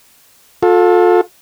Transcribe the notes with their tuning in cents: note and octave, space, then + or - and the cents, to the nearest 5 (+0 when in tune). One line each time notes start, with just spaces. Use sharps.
F4 +35 A4 +0